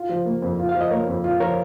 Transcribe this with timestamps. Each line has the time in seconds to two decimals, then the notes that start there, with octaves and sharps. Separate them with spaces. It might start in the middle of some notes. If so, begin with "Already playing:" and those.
Already playing: F4
0.09 F3
0.25 A#3
0.42 F2
0.59 F4
0.69 F5
0.74 F3
0.81 D#5
0.91 A#3 A#4 C#5
1.07 F2
1.24 F4
1.40 F3 A#4 C#5